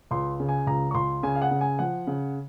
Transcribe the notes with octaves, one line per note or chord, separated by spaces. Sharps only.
C#2 C6
C#3
G#5
C#2 A#5
C#6
C#2 C6
C#3 G#5
F5
F#5
C#3
G#5
F3 F#5
C#3